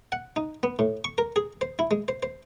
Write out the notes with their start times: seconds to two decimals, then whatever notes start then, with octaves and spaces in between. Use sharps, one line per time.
0.12 F#5
0.36 D#4
0.63 B3
0.79 A2
1.04 C#6
1.18 A#4
1.36 G#4
1.61 C5
1.79 E4
1.91 G#3
2.08 C5
2.23 C5